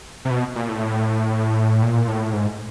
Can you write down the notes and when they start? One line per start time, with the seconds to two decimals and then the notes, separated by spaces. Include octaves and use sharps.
0.25 C3
0.31 B2
0.55 A#2
0.69 A2
1.82 A#2
2.08 A2
2.33 G#2